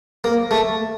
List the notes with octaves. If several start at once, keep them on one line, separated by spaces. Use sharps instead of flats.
A#3
A3